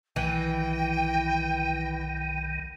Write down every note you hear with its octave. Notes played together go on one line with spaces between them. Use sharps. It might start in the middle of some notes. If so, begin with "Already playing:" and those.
B1 D#3 E3 G5